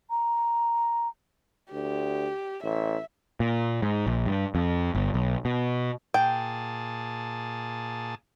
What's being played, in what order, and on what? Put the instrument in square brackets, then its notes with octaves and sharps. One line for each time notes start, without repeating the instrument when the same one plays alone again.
[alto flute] A#5
[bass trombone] D2 [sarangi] G4
[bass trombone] A1 [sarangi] E5
[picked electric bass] A#2
G#2
A#1
G2
F2
G1
B1
B2
[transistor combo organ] A#2 G#4 A5 [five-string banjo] G5